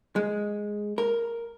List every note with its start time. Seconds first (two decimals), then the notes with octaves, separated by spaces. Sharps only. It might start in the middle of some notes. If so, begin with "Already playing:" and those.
0.16 G#3
0.98 A#4